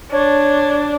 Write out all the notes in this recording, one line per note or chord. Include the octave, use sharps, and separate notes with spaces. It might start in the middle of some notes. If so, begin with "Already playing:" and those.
D4 C#5